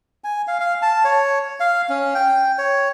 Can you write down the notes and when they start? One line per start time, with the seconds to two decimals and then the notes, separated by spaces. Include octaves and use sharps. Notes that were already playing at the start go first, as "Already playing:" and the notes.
0.24 G#5
0.47 F5
0.60 F5
0.82 A5
1.04 C#5
1.60 F5
1.89 C#4
2.15 G5
2.58 C#5